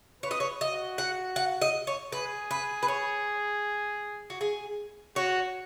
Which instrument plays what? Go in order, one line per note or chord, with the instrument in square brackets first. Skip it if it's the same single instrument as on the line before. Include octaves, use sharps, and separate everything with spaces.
[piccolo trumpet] B4 [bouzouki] C#5
[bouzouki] D#5
C#5
[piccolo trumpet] F#4 [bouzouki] D#5
[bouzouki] F#5
F#5
D#5
C#5
[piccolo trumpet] G#4 [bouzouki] B4
[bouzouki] B4
B4
C#5
F#4
G#4
[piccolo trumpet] F#4 [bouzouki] C#5